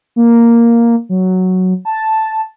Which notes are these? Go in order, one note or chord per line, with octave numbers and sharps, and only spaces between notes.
A#3
F#3
A5